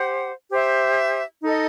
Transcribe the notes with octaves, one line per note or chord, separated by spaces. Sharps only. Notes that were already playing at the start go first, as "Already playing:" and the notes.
Already playing: G4 C5 F#5
G4 C5 E5
D#4 A4 D#5